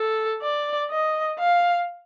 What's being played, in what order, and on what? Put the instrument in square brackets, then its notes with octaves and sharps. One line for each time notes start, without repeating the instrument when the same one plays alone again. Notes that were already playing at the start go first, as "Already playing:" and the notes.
Already playing: [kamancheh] A4
D5
D#5
F5